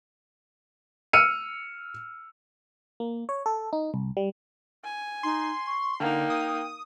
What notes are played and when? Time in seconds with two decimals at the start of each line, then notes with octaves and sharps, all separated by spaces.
1.13 E6 F6 C#7 D#7
3.00 A#3
3.29 C#5
3.46 A4
3.73 D#4
3.94 C2
4.17 G3
4.84 G#5
5.23 D#4 C6
5.67 C#6
6.00 D3 A#3 D#4 G5
6.30 D#6